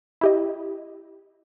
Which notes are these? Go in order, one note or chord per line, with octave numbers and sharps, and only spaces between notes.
E4 G4 D#5